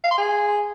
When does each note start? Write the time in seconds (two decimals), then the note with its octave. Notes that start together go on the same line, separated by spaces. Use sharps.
0.04 F5
0.11 C6
0.18 G#4